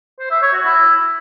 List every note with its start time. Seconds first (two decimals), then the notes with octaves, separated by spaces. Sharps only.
0.19 C5
0.31 E5
0.42 C#5
0.53 F#4
0.65 E4